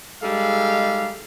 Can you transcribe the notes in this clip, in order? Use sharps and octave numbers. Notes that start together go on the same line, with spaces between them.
G3 G#3 D#4 A4 E5 F5